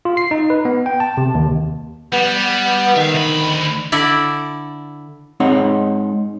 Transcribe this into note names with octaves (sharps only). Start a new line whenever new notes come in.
F4
C7
D#4
B4
B3
G5
A5
C3
D#2
G3 B3
D#3 E5 F5
D2 B5
D3 E4 D5
G#2 C4 D#4 C#5 F#5